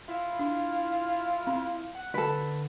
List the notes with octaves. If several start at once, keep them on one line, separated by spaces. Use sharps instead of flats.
E4 F4
D4
C4
F#5
D3 A4 B4